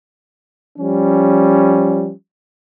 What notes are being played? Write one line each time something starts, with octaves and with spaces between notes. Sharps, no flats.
F3 G3 C#4